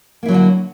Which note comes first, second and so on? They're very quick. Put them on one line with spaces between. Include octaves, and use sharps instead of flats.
A#3 E4 F#3 D3 F#4